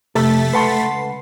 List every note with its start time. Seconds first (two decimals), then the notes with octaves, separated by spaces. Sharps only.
0.15 F2 C3 A3 A4 A6 B6
0.53 C#2 B4 F#5 A5 B5 C6 C7